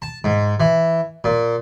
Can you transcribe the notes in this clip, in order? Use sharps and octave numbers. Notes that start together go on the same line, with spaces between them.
A5
G#2
E3
A#2